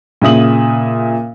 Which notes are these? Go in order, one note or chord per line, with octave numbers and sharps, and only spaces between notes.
A#2 C#3 E5 D#6 F#7